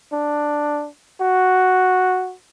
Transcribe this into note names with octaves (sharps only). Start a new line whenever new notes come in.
D4
F#4